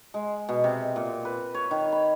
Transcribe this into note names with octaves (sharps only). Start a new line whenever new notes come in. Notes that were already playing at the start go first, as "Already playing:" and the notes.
G#3
B2
C3
A#2
B4
C#5
D#3
B5